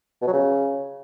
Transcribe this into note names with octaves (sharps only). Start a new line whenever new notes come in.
B2
F#3
C#3